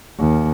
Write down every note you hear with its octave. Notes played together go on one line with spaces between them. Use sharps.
D#2